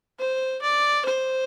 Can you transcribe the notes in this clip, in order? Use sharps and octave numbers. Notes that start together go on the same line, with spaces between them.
C5
D5
C5